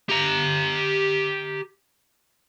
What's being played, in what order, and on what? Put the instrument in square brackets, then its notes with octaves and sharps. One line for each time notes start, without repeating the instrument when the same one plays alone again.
[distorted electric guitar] G4 A#5